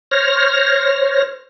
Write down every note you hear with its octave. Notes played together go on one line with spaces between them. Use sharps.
C5 C#5 F6 A#6